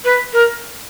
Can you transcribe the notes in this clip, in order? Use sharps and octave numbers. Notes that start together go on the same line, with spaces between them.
B4
A#4